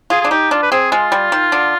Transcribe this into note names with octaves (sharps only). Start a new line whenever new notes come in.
F4 G#4
D4 G#4
D#4 G4
D4 F4
B4
C4 G#4
G#3 F4
G3
D#3
D3